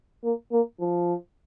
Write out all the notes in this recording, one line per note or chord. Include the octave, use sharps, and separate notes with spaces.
A#3
A#3
F3